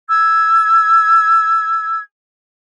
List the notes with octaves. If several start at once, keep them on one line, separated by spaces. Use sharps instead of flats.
E6 G#6